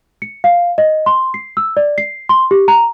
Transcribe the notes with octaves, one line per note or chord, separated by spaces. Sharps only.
C#7
F5
D#5
C6
C7
E6
D5
C7
C6
G4
A#5